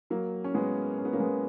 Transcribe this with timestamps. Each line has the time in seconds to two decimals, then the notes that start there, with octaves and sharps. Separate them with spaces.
0.10 F#3 A#3
0.44 C#4
0.54 G#3 B3
0.98 C#4
1.05 B3
1.13 A#3 C#4
1.20 G#3 B3